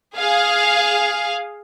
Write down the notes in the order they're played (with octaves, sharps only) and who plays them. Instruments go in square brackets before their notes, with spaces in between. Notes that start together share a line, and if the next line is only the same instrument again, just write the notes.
[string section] G#4 F5